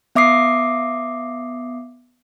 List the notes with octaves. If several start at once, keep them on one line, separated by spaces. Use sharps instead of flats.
B3 E5 D6 D#6 C7